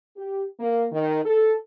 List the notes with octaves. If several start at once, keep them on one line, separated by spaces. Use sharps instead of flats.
G4
A#3
D#3
A4